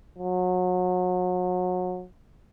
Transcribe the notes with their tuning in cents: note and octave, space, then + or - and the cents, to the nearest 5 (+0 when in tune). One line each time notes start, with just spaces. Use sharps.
F#3 -30